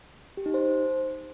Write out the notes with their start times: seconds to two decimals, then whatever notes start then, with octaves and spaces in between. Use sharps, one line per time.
0.37 G4
0.46 D#4
0.54 C5